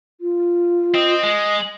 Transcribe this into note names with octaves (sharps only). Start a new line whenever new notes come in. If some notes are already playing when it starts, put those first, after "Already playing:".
F4
C4 D#5
G#3